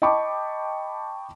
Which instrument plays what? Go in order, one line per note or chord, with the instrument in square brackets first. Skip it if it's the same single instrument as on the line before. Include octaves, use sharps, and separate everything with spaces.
[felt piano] D#5 G5 A5 B5 C#6 D6